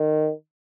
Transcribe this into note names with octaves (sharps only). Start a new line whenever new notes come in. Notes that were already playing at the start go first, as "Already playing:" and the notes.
Already playing: D#3